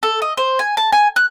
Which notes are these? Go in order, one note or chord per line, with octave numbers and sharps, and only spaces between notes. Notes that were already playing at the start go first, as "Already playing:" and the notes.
A4
D#5
C5
G#5
A5
G#5
F#6